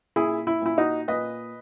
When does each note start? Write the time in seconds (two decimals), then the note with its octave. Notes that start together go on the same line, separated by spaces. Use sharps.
0.16 A#2 E4 G#4
0.47 E4
0.62 A#2 E4
0.78 D#4 F#4
1.08 A#2 B4 D#5